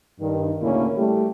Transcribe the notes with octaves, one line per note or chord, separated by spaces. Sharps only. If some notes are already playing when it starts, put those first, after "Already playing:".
G2 D#3
D2 A2 C#3 A#3 C#4 E4
G3 A3 G4